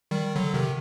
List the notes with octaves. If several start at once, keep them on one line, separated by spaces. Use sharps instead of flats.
D#3 G3
D3 F#3
C3 D#3